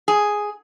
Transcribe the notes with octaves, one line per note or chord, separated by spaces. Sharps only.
G#4